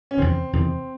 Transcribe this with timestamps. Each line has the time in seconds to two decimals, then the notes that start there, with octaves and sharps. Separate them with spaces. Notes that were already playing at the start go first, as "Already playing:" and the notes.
0.11 C#4
0.17 E2 C3 D#3 C4
0.53 E2 C3 D#3 C4